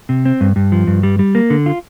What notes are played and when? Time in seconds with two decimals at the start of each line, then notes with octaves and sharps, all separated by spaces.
0.09 C3
0.26 C4
0.41 G2
0.56 G2
0.72 F3
0.87 G2
1.03 G3
1.19 G3
1.35 A#3
1.50 D3
1.66 F4